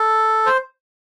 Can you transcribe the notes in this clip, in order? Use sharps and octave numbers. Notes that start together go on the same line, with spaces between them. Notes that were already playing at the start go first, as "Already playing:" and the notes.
Already playing: A4
C5